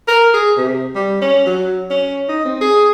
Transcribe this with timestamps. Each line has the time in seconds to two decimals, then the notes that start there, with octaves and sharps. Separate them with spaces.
0.08 A#4
0.34 G#4
0.57 C3
0.95 G3
1.22 C#4
1.46 F#3
1.90 C#4
2.29 D#4
2.45 C4
2.61 G#4